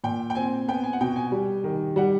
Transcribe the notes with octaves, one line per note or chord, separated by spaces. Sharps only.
A#2 G5
G5
C4 G#5
B3 G5
G#5
F#5
B2 G5
G#5
G3
D#3
G3 F#5